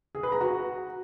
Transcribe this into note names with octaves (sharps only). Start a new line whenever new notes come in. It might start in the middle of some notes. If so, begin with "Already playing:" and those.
G#4
B4
A#5
F#4